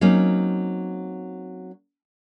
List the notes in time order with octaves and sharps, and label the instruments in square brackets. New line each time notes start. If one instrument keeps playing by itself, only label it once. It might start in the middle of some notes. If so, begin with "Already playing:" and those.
[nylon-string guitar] F#3 A#3 C4 C#4 D#4